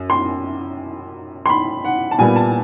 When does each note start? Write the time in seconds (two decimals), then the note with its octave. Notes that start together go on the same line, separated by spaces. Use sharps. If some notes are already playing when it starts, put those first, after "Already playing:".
Already playing: F#2
0.10 C6
1.46 C6
1.49 B5
1.85 F#5
2.11 A5
2.18 A#2 G3 B3 G#5
2.36 A5